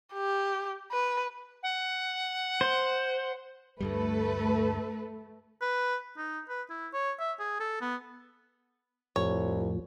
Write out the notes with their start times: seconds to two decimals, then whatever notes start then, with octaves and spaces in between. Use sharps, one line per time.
0.13 G4
0.92 B4
1.63 F#5
2.61 C5
3.81 D2 G2 G3 A3 A4 B4
5.61 B4
6.17 D#4
6.49 B4
6.70 E4
6.93 C#5
7.19 E5
7.39 G#4
7.60 A4
7.81 B3
9.16 C2 F2 A2 F3 C#5